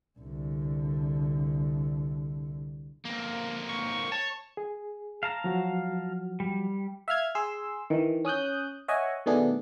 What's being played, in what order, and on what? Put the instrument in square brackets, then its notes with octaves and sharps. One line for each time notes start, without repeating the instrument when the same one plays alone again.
[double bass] C2 D3
[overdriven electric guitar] A#3 C4
[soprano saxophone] C#6
[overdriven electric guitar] C#5 [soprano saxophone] A5
[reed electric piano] G#4
[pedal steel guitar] F5 A5 A#5
[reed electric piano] F3 F#3 F#4
[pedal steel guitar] G3
[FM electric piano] E5 F5 F6 G#6
G#4 C6 E6
D#3 E3
C#4 D#6 F#6 G6
C#5 D#5 E5 F#5 G#5
B2 D#3 A3 B3 D4 G#4